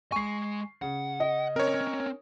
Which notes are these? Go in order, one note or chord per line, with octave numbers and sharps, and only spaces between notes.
G#3 G#5 C#6 C7
C#3 F#5
D#5
C4 C#4 A#4 C#5